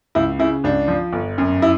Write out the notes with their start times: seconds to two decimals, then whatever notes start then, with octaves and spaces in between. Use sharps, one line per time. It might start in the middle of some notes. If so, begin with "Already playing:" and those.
0.15 C#2 E4
0.39 C#3 E4
0.64 C#2 D4
0.88 F3
1.13 G1
1.38 F#2
1.62 E4